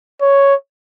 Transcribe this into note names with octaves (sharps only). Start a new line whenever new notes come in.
C#5